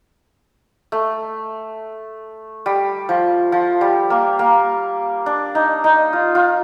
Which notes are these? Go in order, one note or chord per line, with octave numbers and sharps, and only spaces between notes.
A3
G3
F3
F3
G3
A#3
A#3
D4
D#4
D#4
F4
F4